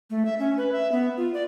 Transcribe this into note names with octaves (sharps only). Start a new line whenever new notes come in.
A3
E5
C#4
B4
E5
B3
F4
D5